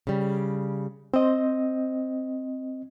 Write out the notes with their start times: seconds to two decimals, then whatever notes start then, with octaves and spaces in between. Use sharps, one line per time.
0.07 C#3 G3
1.14 C4 C5 D#5